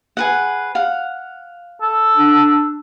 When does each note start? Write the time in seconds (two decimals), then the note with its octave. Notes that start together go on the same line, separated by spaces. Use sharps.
0.17 G#4 B4 F#5
0.75 F5 F#5
1.82 A4
2.17 D4